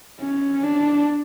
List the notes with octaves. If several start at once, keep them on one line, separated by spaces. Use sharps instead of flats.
C#4
D4